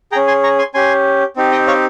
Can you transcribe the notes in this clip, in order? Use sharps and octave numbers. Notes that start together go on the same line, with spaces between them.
C#4 G#4 G5 A#5
G#5 C6
A#5 C#6
G#5 C6
C#4 G4 G#5 C6
C4 D#4 G4
D#5 G5
C#5 F5